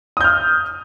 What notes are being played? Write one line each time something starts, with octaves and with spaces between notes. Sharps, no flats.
D#6 F6 G6